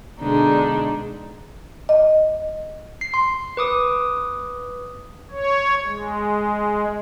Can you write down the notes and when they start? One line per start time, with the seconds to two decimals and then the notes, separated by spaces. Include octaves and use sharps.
0.20 B2 D3 G#3 D4 D#4
1.89 D#5
3.01 C7
3.14 C6
3.57 B4 D6 D#6
5.31 C#5
5.85 G#3